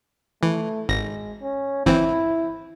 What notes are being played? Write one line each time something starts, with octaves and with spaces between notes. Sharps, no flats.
E3 A3
G#1 G#3 A#6
C#4
G1 E3 C4 E4